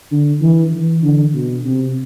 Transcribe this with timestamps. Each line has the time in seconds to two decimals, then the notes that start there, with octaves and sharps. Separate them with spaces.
0.11 D3
0.42 E3
0.73 E3
1.03 D3
1.34 B2
1.65 C3